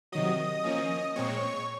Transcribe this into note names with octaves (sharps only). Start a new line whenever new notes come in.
C3 D#3 F#3 D#5 D#6
F3 A#3 C#4
A#2 G#3 C4 C#5 C#6